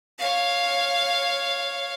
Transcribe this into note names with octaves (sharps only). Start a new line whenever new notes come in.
C#5 F5